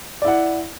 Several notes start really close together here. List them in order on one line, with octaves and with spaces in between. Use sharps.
D5 E4 F#5